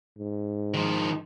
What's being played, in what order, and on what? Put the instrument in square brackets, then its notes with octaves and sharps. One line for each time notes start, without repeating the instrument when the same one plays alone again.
[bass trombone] G#2
[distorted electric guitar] D#3 F3